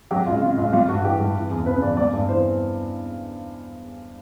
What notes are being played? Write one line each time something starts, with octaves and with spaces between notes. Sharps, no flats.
F#3 G4
C#2 F4
C#3 F4
C#2 F4
G3 F4
G2 F#4
E3 G4
G2
E3
E2
C#3 B4
E2 D5
G3 D5
G2 D5
E3 C5